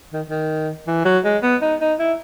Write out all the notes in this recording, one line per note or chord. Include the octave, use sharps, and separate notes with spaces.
D#3
D#3
E3
F#3
G#3
B3
D#4
D#4
E4